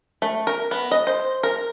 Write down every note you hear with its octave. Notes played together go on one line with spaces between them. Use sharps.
A3
A#4
B3
D#5
C5
A#4